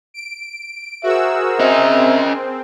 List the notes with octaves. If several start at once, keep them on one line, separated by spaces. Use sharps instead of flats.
D7
F#4 G#4 A#4 C5 E5 E6
C4 C#4 D#5 E5